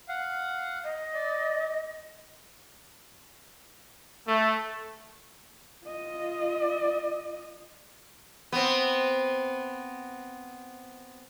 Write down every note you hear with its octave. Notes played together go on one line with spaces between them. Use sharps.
F5 F#5
D#5
D5
A3
F4 D#5
B3 C4